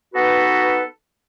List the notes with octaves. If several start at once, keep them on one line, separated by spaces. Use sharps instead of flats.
B3 D#4 F#4 A4 B4